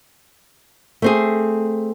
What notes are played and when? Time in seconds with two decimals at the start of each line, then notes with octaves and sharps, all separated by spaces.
1.02 A3 C4 G#4